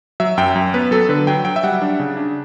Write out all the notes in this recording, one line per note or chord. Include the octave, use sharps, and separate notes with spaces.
F#3 E5
F#2 G5
F#2
B3 B4
F#3 A4
D3 B4
F#3 G5
F#3 G5
E5
G3 F#5
D4
C#3
D4